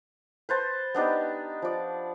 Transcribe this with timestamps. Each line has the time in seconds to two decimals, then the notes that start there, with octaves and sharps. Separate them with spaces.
0.49 B4 C5 A5
0.95 B3 D4 D#4 G4
1.62 F3 D5